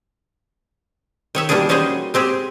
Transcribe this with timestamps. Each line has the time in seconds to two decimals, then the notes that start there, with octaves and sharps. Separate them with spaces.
1.35 D#3 C#5 E5
1.49 B2 D#3 G3 A#3 D4 G#4
1.69 G3 C#4 D#4 F#4 G#4 C5
2.14 G#3 C4 G4 G#4